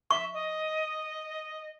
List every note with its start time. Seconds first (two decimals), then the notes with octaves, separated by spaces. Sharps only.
0.11 E5 C#6
0.34 D#5